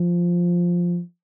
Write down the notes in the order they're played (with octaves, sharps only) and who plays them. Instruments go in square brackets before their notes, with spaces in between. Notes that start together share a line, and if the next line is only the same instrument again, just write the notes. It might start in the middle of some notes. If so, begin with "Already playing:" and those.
Already playing: [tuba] F3